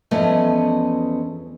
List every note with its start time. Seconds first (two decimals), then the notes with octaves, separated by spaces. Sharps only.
0.11 E2 F3 A3 C#4 D#5 G#5